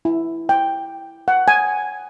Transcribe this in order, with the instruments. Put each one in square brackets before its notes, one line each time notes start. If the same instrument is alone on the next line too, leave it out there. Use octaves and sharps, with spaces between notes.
[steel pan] E4
G5
F#5
G#5